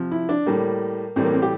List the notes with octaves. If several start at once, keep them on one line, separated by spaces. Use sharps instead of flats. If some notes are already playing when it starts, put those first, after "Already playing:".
Already playing: C3 F3
E4
D4
A2 G3 A#3
A2 E3 G3 C4
A#3
C4
G4